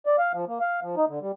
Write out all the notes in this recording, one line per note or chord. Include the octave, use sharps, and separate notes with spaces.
D5
F5
F3
A#3
F5
F3
D#4
D3
G3